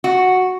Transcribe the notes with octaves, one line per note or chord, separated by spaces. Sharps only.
F#4